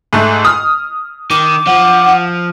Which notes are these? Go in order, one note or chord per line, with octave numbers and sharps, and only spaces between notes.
G#2 A3
D#6 F6
D#3 D6
F3 F#5